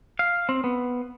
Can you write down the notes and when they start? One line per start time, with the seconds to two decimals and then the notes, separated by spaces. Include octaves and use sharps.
0.19 F5
0.49 C4
0.64 B3